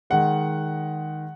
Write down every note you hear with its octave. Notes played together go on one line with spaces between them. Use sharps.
D#3 G#3 F#5